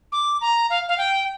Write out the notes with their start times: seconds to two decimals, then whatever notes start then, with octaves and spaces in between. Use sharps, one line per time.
0.12 D6
0.41 A#5
0.70 F5
0.89 F5
0.98 G5